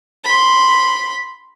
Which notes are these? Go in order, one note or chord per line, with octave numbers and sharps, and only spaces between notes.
B5 C6